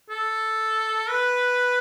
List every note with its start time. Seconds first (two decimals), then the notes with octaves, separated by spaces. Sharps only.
0.10 A4
1.09 B4